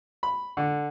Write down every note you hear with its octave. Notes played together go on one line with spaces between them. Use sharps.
B5
D3